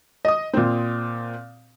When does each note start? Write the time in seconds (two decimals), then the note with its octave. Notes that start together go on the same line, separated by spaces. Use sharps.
0.25 D#5 D#6
0.54 A#2 C4